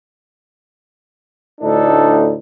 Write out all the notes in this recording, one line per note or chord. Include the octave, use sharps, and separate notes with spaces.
D2 A2 D4 D#4 A4